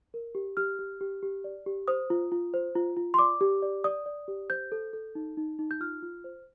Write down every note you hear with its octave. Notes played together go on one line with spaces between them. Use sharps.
A#4
G4
G4 F6
G4
G4
G4
D5
G4
C5 D#6
F4
F4
C5
F4
F4
C6
D5 D6
G4
D5
D5 D#6
D5
G4
C5 G6
A4
A4
D#4
D#4
D#4
G6
F4 F6
F4
C5